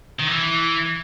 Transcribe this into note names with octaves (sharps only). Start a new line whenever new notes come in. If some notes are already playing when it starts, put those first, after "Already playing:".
D#3
E3